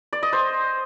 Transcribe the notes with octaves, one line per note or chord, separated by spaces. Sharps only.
D5
D#5
C5